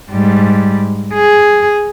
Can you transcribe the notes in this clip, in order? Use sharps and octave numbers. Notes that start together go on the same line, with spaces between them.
G#2 G3
G#4